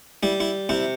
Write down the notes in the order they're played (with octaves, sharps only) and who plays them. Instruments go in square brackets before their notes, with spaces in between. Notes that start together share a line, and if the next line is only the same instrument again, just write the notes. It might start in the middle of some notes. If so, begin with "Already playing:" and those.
[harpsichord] G3 E4
E4
C3 E4